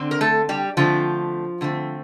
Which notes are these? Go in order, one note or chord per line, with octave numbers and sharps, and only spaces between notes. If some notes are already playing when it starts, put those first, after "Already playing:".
Already playing: D3 C4
A#4
A3 A4
G3 G4
D3 F3 A3 C4 F4
D3 A3 C4